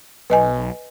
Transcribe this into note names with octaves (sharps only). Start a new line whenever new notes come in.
B1 B4 D#5 G#5